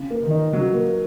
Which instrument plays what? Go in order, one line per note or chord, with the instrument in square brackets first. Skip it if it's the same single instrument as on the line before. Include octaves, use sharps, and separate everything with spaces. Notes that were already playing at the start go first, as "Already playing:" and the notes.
Already playing: [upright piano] C#3
A#3
[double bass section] D#3
[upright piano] D#4
[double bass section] C#3 [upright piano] F#3
[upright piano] A#3